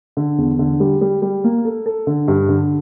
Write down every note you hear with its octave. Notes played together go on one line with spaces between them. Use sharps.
D3
E2
D3
G3
G3
G3
A#3
A4
A4
D3
G2
D3